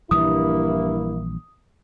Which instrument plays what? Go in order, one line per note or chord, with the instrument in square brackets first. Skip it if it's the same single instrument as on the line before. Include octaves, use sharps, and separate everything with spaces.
[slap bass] A#1 E3 G3 [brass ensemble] G2 A#3 E4 [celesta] D#6